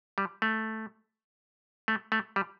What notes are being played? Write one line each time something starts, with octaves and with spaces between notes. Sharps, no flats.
G3
A3
A3
A3
G3